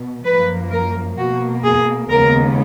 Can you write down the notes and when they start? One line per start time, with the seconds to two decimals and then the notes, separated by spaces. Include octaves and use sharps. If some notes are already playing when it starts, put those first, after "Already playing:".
Already playing: B2
0.25 F#2 F3 A#3 B4
0.71 A#4
1.18 B2 A#3 F#4
1.64 G#4
2.10 D#2 C#3 G#3 B3 A#4